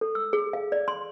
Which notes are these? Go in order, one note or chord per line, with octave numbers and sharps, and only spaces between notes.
A4
E6
G#4
F5
D5
C6